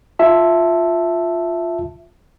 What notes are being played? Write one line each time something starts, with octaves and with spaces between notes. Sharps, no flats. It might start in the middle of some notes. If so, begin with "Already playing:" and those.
F4 E5 A5